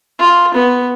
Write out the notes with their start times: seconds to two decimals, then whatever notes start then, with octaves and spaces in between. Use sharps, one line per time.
0.19 F4
0.54 B3